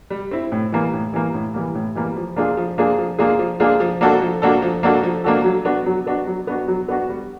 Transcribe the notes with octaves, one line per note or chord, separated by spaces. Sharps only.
G3
C4 E4
A2
E3 G3 A#3
A2
E3 G3 A#3
A2
E3 G3 A#3
A2
E3 G3 A#3
F3
A#3 D4 F4 G#4
F3
A#3 D4 F4 G#4
F3
A#3 D4 F4 G#4
F3
A#3 D4 F4 G#4
F3
A#3 D4 F#4 A4
F3
A#3 D4 F#4 A4
F3
A#3 D4 F#4 A4
F3
A#3 D4 F#4 A4
F#3
B3 D4 F#4
F#3
B3 D4 F#4
F#3
B3 D4 F#4
F#3
B3 D4 F#4
G3